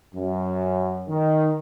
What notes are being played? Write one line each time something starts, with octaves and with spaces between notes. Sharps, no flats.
F#2
D#3